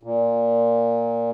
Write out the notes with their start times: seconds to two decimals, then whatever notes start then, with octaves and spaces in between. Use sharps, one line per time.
0.03 A#2